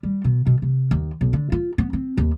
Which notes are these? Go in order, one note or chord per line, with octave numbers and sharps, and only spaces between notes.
G3
B2
B2
C3
D#2
B1
D3
F4
B3
C4
D#2